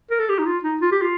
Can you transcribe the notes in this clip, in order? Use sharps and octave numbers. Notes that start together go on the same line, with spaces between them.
A#4
A4
G4
D#4
F4
D#4
F4
G4
F4